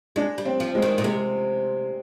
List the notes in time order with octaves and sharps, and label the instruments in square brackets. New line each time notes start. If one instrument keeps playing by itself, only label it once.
[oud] G#3 [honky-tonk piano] D4
[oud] G3
[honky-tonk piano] C4
[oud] F3
[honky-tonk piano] G#3
[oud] D#3
A#2
[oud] C3 [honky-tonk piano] G#3